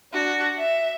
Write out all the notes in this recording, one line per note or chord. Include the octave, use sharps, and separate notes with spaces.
D4 F#4
E5